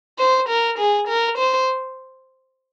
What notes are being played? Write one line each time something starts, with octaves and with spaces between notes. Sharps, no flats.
C5
A#4
G#4
A#4
C5